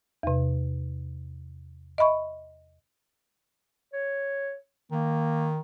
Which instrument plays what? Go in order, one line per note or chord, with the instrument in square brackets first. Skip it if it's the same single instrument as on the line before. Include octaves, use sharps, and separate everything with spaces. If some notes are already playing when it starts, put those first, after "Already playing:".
[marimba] E2 C3
D#5 E5 B5 C#6
[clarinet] C#5
[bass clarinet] D#3 [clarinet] A#3